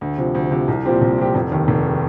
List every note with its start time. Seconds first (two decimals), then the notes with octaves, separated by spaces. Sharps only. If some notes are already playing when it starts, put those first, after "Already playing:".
0.01 D2
0.18 C3 F3
0.35 D2
0.51 C3 F3
0.68 C2
0.85 A#2 F3 C4 G4
1.01 C2
1.18 A#2 F3 C4 G4
1.35 F1
1.51 D#2 D#3
1.68 F1
1.86 D#3